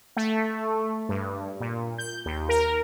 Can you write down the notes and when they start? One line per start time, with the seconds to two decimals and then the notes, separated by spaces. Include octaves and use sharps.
0.17 A3
1.09 G2
1.60 A#2
1.98 G6
2.25 D#2
2.49 A#4